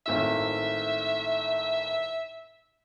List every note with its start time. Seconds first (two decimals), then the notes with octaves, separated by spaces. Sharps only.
0.06 G#1 A2 E5 E6